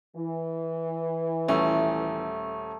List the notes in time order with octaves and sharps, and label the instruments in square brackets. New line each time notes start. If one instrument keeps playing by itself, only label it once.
[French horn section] E3
[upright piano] D#1 C#4 [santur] A3